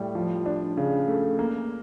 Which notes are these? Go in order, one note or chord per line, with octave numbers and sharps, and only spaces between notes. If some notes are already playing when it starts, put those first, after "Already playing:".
Already playing: A2 G3
F3
D4
C#3
A3
A#3